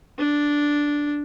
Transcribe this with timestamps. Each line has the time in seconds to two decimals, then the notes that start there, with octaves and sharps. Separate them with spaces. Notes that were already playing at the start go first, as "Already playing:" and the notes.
0.19 D4